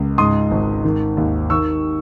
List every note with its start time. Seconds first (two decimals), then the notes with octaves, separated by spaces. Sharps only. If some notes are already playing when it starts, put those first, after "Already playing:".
Already playing: C#2
0.18 G#2 C6 D#6
0.51 G#1
0.84 D#3
1.17 D#2
1.50 D#3 C#6 E6